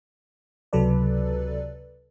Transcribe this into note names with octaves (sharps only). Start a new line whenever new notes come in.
C#2 C3 F#3 A4 B4 D5